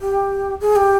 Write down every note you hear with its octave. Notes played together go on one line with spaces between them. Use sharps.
G4
G#4
G4